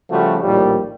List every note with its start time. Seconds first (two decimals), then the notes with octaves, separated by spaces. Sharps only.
0.10 C#3 F3 G3 A3 F#4
0.42 A#1 D#2 A2 G3